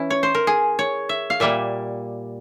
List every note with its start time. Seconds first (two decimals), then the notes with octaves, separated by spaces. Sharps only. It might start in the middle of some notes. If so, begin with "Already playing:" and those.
Already playing: E3 C#4 E4
0.10 C#5
0.23 C5
0.35 A#4
0.47 G#4
0.79 C#5
1.09 E5
1.30 F5
1.40 A#2 G3 A#3 E5